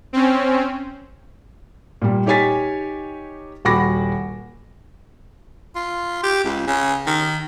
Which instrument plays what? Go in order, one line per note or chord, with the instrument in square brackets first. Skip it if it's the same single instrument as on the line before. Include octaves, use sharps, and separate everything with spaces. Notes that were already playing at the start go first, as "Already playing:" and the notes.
[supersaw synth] C4 C#4
[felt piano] A#2 G3
D#4 G4 C#5 G#5 A6 B6
D#1 F#4 B5 D6 A#6
[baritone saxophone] F4
G4
C#2
C#3
D#3